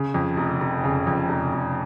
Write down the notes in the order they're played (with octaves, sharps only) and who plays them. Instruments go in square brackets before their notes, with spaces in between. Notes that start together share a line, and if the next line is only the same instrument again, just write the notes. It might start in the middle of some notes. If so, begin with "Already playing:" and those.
Already playing: [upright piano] C#3
F2
F1
F1
C#3
F2
F1
F1